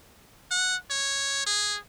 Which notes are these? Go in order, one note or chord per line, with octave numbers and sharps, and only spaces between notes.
F#5
C#5
G#4